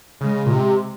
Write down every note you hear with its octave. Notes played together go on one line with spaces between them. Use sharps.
C#3 G#3
A#2
C3